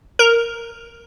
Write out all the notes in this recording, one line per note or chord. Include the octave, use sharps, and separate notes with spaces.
A#4